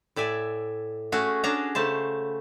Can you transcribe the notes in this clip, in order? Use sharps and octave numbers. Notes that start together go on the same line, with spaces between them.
A2 D5 E5 G#5
A3 C#4 F#4 G#4
C#4 D4 G#4 A5 A#5
C#3 A3 C5 A5